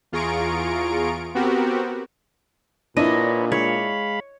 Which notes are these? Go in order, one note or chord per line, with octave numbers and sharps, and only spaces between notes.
E2 F4 G#4 A#5 C#6 D7
B3 C4 F#4 G4 A#4
A#2 D4 E4 B4 C#5 D#5
G#3 C#5 F5 B5